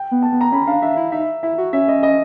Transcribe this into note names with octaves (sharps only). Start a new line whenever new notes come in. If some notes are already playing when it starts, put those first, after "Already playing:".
Already playing: G5
B3
A5
B3
A#5
C#4 B5
D4 F5
D4 E5
E4
D#4 E5
E4 E5
F#4
C#4 E5
D#5
D#5